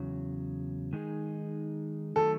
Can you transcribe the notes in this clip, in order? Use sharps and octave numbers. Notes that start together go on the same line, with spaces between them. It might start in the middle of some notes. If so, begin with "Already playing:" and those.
Already playing: E2 C#3 F#3
D#3 G#3 D#4 G#4
D#3 F#3 A3 A4